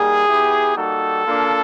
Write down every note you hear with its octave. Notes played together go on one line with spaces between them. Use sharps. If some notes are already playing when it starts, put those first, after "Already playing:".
Already playing: G3 A#3 D#4 G#4
B3 E4 G4
G3 A#3 D#4 F#4 A4
A#3 D4 F4